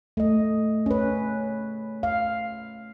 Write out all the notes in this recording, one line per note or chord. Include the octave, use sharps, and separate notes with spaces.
A3 D#5
C#4 B4
F5